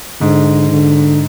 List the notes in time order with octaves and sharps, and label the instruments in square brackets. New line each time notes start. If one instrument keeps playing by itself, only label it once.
[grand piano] G#2 [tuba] D3
[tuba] D3